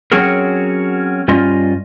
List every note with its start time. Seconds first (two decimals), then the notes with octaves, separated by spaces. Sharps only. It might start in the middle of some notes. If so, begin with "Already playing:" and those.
0.12 F#3 C4 C#4 F#4 G#4 A#4
1.28 G2 G3 C#4 F4 D#5